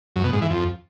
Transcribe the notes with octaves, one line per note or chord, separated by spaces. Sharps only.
F#2
B2
G#2
E3
F2